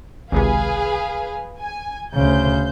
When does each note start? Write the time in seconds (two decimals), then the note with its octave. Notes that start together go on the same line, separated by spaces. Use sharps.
0.32 G#1 C#2 C3 G#4 B4 F5
1.62 G#5
2.15 D2 C#3 C5 G6